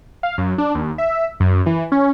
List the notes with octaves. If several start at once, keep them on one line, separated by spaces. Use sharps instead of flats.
F5
F#2
D4
D#2
E5
F#2
E3
C#4